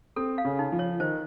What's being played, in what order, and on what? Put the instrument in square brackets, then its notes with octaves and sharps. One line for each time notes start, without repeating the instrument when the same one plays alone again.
[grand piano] C4 [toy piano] A4
[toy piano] F5
[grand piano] C#3
[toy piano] D#4
[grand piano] F3
[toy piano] C#5
[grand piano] D#3 [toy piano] C5